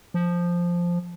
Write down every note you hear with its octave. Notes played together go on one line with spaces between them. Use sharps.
F3